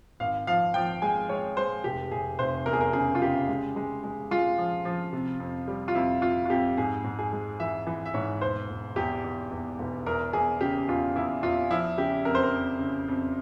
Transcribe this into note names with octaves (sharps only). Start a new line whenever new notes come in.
G#1 F5
F3 F5
F3 G5
G#3 G#5
G#3 C#5
G#3 C5
F1 G4
F1 G#4
F1 C5
E2 A#4
G#4
A#4
C#3 G#4
F4
C#3 G4
G#3
G#3
G#3
G#3 F4
F3
F3
C3
F2
G3
F4
F2 E4
F2 F4
F4
F2 G4
G#2 G#4
G#2
G#4
G#3
E3 E5
E3
E5
G#2 C#5
E1 C5
E1
E2 G4
E2
E2
E1
E2 A#4
E2 G#4
C#3 G4
E2 F4
E2 E4
E2 F4
F3 E4
C#3 G4
F2 A#4
C5
A#4
F2
C#3
F2